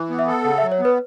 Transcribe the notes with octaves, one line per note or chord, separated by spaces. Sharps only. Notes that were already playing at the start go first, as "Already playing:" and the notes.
Already playing: E3
B3
E5
A4
C#3 F#5
E5
F#3
C#5
B3
B4